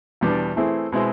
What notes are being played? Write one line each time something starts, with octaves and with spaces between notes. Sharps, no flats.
E2 B2 G3 B3 D4
E3 A3 C4 E4 G#4
B2 G#3 C4 E4